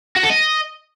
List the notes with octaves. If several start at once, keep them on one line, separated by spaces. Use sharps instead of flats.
F#4
A4
D#5